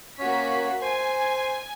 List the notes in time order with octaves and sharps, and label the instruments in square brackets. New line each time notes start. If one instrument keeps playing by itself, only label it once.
[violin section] A#3 F#4 B6 [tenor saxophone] C#4
[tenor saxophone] C5 [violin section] G#5